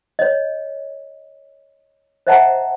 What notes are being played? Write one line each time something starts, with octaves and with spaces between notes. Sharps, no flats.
C#5 D#5
C5 D#5 E5 F#5 A5 A#5